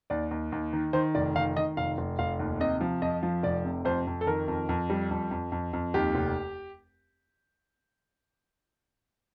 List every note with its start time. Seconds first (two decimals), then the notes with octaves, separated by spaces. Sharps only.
0.10 D#2 D5
0.31 D#2
0.52 D#2
0.73 D#3
0.93 D#3 C5
1.15 F1 D5
1.36 D#3 F5
1.56 D#3 D#5
1.77 F1 F5
1.98 F1
2.19 F1 F5
2.39 D#2
2.60 C3 D#5
2.81 F3
3.02 F2 D#5
3.23 F3
3.43 F1 D5
3.65 C3
3.85 F2 C5
4.07 F2
4.21 A4
4.27 D#3 A#4
4.48 F2
4.69 F2
4.90 G3
5.11 F2
5.31 F2
5.52 F2
5.73 F2
5.94 D#2 G4
6.15 F1